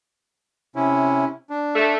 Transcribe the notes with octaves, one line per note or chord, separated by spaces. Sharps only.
C3 C#4 E4
D4
A3